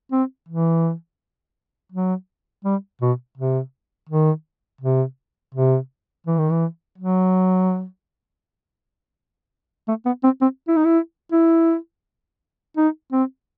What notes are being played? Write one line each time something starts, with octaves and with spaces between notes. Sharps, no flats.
C4
E3
F#3
G3
B2
C3
D#3
C3
C3
E3
D#3
E3
F#3
A3
B3
C4
C4
E4
D#4
E4
E4
D#4
C4